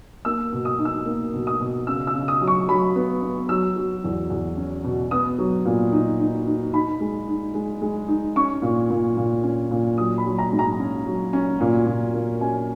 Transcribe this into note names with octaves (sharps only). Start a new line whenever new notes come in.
A#3 E6
B2
D#6
D#4
E6
A#3
B2
D#6
B2
C#3 E6
E6
C#3
D#6
F#3
C#6
F#3 B5
B3
B3
F#3 E6
F#3
E2
E2
C#4
B2
B3 D#6
F#3
A#2
D#4
D#4
D#4
D#4 B5
G#3
D#4
G#3
G#3
D#4
C#4 C#6
A#2
A#2
A#2
C#4
A#2
F#3 D#6
B5
F#3
A#5
G#2
A#5
C#4
F#3
C#4
A#2
A#2
A#3
C#4 G#5